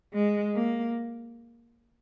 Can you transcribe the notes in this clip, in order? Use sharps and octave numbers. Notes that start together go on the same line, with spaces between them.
G#3
A#3